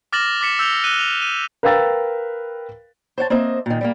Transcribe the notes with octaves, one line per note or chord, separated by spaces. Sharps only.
D6 F6 A6 A#6 E7 F#7
D6 A6 B6 C#7 E7
D6 E6 G6 A6 F7 G7
D6 E6 F#6 D#7 G7
F7
D#7
A#4 B4 F5 G5 E6 A6
C5 C#5 F#5 A5
A#3 C4 C5 D#5 E5
A#2 D#3
G3 A3 A#3